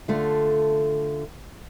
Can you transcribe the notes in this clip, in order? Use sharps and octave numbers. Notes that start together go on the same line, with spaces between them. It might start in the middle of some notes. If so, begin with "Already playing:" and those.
D3 A3 F4